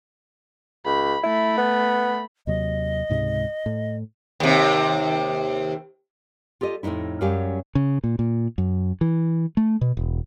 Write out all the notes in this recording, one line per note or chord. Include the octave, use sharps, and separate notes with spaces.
C#2 B5
A3 E4 B5
B3
D#2 C3 F#3 D#5
C#2 G#2 C3
A2
D#2 C3
F4 G4 A4 D#5
F2 A2 C#3 D#4 E4
F#2 F#3 G3 C#4 G4 F5
C#3
A#2
A#2
F#2
E3
A3
B2
E1